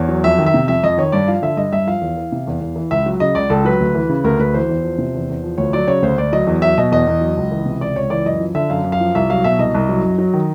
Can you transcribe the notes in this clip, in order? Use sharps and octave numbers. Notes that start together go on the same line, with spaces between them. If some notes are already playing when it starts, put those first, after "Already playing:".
Already playing: E2 C#5
F#3
F2 E5
D#3
E5
C3
F2 E5
F2 D#5
D#3 C#5
G2 D5
F3 F5
D3 E5
G2 D#5
G2 E5
F3 F5
E2
E3
C3
E2
E2
E3
C#2 E5
F#3
C#3 D#5
C#2 D5
C#2 A4
F#3 B4
D2
E3
C#3
D2 A#4
D2 B4
E3 C5
E2
F3
C3
E2
E2
F3
D2 C#5
F#3 D5
C#3 C#5
D2 C5
D2 D5
F#3 D#5
E2
F#3 E5
B2 D#5
E2 D#5
E2
F#3
C#2
E3
C3
C#2 D5
C#2 C#5
E3 D5
F#2 D#5
F3
D3 E5
F#2 F5
F#2
F5
F3
C2 E5
F#3 F5
B2 E5
C2 D#5
C2
F#3
F#2
F#3
D#3